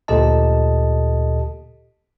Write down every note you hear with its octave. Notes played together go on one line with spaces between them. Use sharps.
D2 A#2 G4 A4 D#5 A5